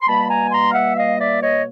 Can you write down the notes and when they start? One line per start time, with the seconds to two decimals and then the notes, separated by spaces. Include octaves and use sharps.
0.02 C6
0.06 B2 G3 A#3 A5 B5
0.29 G#5 A#5
0.52 A#5 C6
0.70 F5
0.74 E5 F#5
0.97 D#5 F5
1.19 D5 E5
1.42 C#5 D#5